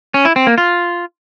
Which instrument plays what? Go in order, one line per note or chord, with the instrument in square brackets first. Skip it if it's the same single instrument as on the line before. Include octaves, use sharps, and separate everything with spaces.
[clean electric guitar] C#4
E4
C4
A#3
F4